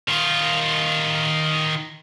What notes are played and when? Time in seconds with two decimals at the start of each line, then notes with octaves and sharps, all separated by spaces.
0.09 D#3 F4